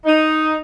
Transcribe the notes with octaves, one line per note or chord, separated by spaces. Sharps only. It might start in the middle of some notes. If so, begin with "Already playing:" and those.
D#4